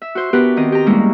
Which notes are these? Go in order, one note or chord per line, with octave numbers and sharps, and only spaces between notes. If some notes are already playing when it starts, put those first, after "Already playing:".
E5
F#4 C5
B3 D4 F#4 G4 A#4 B4
D#3 C4 D#5
G4 A#5
G3 G#3 A#3 C#4 E4